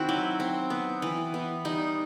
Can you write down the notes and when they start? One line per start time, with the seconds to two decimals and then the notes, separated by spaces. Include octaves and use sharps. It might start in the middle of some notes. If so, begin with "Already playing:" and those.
Already playing: D#3 C4 E4 F#4
0.09 F#3
0.40 C4
0.70 B3
1.02 E3
1.34 B3
1.65 G3 D#4